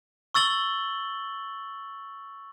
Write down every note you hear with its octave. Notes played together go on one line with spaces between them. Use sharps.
C#6 E6 A6 F#7 G7